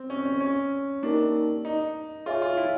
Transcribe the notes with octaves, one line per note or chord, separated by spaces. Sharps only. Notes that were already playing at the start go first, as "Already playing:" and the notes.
Already playing: C4
C#4
C#4
C#4
A#3 D4 D#4 G4 A#4
D#4
F4 G#4 C#5 E5 G#5
F4
E4